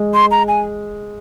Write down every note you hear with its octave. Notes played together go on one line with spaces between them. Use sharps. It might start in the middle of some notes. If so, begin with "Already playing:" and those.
Already playing: G#3
C6
A#5
G#5